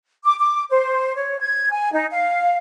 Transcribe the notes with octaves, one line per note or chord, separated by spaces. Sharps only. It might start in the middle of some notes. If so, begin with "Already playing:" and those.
D6
D6
C5
C#5
G#6
G#5
D#4
F5